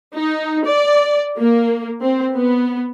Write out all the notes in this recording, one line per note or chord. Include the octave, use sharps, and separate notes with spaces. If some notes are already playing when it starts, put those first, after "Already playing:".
D#4
D5
A#3
C4
B3